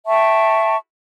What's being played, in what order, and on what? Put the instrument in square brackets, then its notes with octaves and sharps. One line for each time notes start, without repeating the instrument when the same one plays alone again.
[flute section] E5 G5 A5 C#6